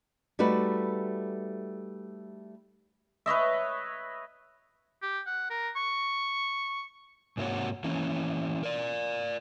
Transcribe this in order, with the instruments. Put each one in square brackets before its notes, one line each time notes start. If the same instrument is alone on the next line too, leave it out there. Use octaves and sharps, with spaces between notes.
[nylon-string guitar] G3 A3 D#4 F#4 B4
[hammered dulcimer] B4 C#5 D#5 E5
[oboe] G4
F#5
A#4
C#6
[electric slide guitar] G#2 C3 A#3 F#4 C#5 F#5
E3 A#3 C#4
A#4 D5